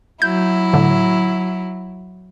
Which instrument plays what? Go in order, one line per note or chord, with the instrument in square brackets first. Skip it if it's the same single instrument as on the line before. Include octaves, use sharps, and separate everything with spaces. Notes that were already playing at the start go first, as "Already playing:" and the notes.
[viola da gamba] F#3 E4 [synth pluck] G6
[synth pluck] A2 D3